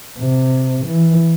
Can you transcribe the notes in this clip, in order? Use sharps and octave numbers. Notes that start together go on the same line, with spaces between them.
C3
E3